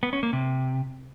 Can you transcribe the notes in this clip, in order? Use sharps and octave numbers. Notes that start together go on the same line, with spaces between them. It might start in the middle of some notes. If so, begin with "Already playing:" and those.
B3
C#4
A#3
C3